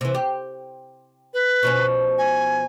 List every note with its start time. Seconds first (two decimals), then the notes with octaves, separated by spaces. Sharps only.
0.01 C3 E3
0.15 G4
1.34 B4
1.63 B2 F3 C#4
2.18 G#5